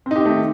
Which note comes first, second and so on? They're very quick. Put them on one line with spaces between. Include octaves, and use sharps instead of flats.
C4 D#4 G4 D#3 A3